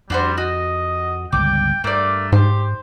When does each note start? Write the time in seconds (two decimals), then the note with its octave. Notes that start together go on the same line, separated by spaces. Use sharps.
0.10 F2 G3 D4 F#4 C5
0.38 F#4 D#5
1.32 G1 C#2 G3 G5 D6
1.84 G2 A3 A#3 D5
2.32 G#2 G4 C5